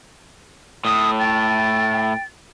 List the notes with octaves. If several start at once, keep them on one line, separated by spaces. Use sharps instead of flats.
A2 D#6
G5 A6